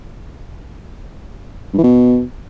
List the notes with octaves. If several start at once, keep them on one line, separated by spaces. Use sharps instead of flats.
G2
E3
B2